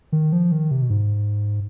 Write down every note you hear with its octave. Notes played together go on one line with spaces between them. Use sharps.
D#3
F3
D#3
C3
B2
G#2